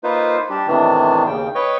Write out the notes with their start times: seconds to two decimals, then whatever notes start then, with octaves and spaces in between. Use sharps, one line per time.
0.04 A#3 D#4 F4 B4 C5
0.50 G3 D4 G4
0.68 A2 C3 D#3 E3 B3 D4
1.27 D#2 C#3 G5
1.55 B4 C#5 D#5 G5 C#6